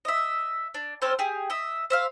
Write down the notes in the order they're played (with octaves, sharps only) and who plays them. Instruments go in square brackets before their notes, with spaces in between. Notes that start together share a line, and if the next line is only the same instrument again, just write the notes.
[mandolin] D#5 E5
D4
C4 C#4 A4 C5
G4 G#4 G#5
D#5 E5
C5 E5 F5